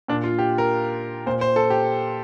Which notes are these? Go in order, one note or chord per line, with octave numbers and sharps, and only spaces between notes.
A#2 D4
F4
G4
A#4
A#2 C5
C5
A4
G4